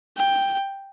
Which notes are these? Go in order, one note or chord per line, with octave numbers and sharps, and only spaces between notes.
G5